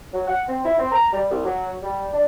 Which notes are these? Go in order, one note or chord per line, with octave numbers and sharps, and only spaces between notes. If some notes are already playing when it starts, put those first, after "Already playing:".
F#3
F#5
C4
E4
C4
A#5
G3
C2
F#3
G3
D4